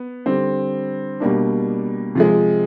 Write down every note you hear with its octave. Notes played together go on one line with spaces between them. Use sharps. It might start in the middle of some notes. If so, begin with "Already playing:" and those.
Already playing: B3
D3 G3 C4
B2 G3 A#3 D4
C3 F3 G#3